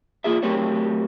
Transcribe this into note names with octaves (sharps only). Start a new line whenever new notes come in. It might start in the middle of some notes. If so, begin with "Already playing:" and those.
A#3 F4 G#4 E5
F#3 A3 C4 G4 A#4 C#5